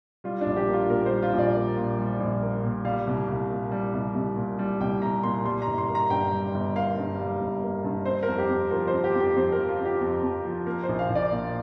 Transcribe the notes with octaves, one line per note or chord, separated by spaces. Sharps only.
G3 F4
D4
A#1
G4
A#3
F4
A#2 A#4
C5
G3
F4
A#1
D5
A#3
A#2
G3
A#1
A#3
A#2
G3 F5
C2
C2
A#2
G3
C2
C2
A#2
G3
C2 G5
C2 A#5
A#2 C6
G3 C6
A#5
G1
C6
A#3
A#5
G2 G5
G3
G1
A#3 F5
G2
G3
G1
A#3
G2
C4 C5
A#4
F2
G4
F2
F3 A#4
C5
C4
G4
F2
G4
F2 C5
A#4
F3
F4
C4
G4
F2
F2
F3
A#3 A#4
C5
A#1
F5
A#1
D5
A#2